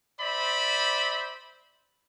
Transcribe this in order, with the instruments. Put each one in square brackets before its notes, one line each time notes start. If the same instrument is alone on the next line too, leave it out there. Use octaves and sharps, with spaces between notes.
[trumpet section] C5 D5 E5 B5